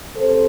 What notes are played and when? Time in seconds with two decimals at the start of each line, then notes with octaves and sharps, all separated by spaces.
0.18 C3 A4 C5